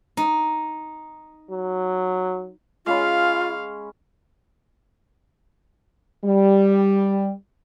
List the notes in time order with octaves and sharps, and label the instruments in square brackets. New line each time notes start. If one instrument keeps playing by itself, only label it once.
[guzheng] D#4
[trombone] F#3
[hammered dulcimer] G#3 C#4 B5 [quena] F4 [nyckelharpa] F5
[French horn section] G3